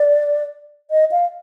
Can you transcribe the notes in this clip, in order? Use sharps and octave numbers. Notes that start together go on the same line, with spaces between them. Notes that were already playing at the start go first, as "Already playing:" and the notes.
Already playing: D5
D#5
F5